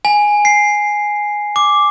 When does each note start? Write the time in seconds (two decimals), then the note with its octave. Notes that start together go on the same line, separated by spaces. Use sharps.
0.05 G#5
0.45 C7
1.56 D6